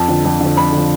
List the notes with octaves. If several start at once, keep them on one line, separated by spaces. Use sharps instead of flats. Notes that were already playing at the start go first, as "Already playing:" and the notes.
Already playing: F2 A5
D3 F3
F2
D3 F3
F2 B5
D3 F3